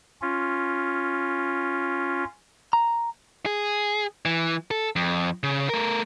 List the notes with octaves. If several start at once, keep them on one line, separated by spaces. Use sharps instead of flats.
C#4 F4
A#5
G#4
E3
A4
F2
C#3
A3 A#4